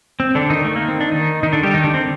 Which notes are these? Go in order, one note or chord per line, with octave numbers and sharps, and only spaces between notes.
C4
D3 D4
D#3 D#4
A3
A#3
C4
D4
D#3 D#4
D#3 D#4
D3 D4
G3 G4
D#3 D#4
D3 D4
C4